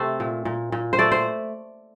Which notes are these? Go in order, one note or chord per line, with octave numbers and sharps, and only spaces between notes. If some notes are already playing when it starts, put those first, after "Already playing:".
Already playing: C3 A3 C5
A#2
A#2
A#2
C5
A3 D5
C5